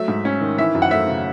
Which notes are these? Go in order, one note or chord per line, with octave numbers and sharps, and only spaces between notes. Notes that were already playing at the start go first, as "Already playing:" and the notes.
Already playing: F#3 A3 E5
G#2
C#4
D#3
E3 E5
F#2
F#5
A3 E5
C#3